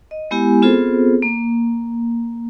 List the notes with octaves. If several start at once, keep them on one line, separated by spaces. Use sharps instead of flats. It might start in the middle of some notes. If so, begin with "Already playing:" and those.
D#5
G#3 B3 E4 G4 G#5
B3 C4 F4 G#4 A4 C5
A#3